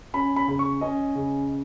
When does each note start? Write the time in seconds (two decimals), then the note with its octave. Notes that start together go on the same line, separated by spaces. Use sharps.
0.14 C#4 B5
0.36 B5
0.48 C#3 B5
0.59 C#6
0.81 C#4 D#5
1.15 C#3